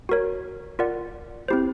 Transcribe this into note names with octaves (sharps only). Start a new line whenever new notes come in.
F#4 A#4 C#5
F4 A#4 D5 F#5
C4 E4 G4 C5